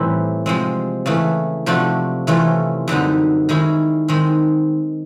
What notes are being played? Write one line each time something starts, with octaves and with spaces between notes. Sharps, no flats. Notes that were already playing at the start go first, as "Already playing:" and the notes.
Already playing: A2 E3 G3 C4 E4
C3 F3 G#3 C4
C#3 E3 A3
C3 F3 A3 D4 F#4
C3 E3 A3 C#4 F4
F#2 D3 G3 C4 D#4
D#3 G#3 C#4 E4 G#4
D#3 G#3 C4